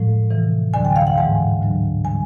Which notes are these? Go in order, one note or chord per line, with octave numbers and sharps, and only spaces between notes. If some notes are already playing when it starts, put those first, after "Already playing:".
Already playing: A2 F3 G#3
F2 C3 E3
D2 D3 F#3 G#5
G5
F5
F#5
G#2 E3 G#3 G#5
D2 D3 F#3
D3 G3 G#5